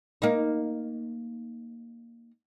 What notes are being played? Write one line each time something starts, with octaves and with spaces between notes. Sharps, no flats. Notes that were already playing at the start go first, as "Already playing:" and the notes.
A#3 D#4